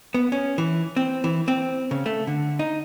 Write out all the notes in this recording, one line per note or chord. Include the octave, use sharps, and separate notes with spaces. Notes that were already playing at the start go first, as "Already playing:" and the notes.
B3
C#4
E3
C4
E3
C4
C#3
A3
D3
D#4